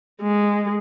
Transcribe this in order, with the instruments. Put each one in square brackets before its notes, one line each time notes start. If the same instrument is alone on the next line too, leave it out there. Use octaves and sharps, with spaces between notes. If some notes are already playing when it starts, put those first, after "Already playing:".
[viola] G#3